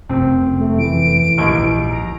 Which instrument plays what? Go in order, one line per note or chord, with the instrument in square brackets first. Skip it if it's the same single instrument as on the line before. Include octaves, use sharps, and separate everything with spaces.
[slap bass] F1 F#2 [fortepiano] C4
[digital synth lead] A3
[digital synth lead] E3 [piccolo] D7
[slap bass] A#1 G#2 [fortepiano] D#2
[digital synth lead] A#5